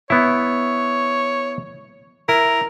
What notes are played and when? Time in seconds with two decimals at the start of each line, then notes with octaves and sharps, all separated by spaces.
0.10 B3 E4 C#5
2.29 E4 A#4